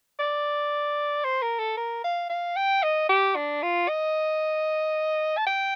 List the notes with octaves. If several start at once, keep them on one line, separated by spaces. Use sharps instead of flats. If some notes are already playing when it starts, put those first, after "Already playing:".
D5
C5
A#4
A4
A#4
F5
F5
G5
D#5
G4
D4
F4
D#5
A5
G5